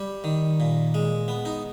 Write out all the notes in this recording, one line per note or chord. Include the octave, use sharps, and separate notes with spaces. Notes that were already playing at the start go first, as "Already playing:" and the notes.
Already playing: G3 G4
D#3
A#2
G#3
B3
D#4